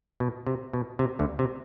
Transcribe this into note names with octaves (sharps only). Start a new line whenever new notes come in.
B2
C3
B2
C3
D2 D3
C3